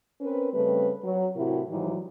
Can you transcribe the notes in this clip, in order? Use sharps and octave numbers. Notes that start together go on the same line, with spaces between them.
C4 C#4 A#4 B4
C#3 G3 A3 C4 B4
F#3 F#4
A2 C3 E4 F#4 G4 A#4
G#2 D#3 E3 F#3 G3